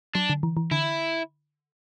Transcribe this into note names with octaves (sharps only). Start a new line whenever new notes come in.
F#3 D4
D3
E3
E3
D3 E4